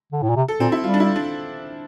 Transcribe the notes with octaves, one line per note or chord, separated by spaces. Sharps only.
D3
A2
A#2
C3
A4
A#2 C4
E4
G3 F4
D4
E4
D4